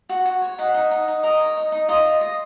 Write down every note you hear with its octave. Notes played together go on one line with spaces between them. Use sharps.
F#4
F#4
C#5
D#4 F#5
D#4
D#4
D#4
A#4 D#5
C#5
D#4
D#4
F4 D#5
F4
D#5